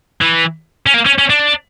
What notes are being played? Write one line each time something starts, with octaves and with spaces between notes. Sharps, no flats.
E3
C#4
A#3
C#4
C#4
D4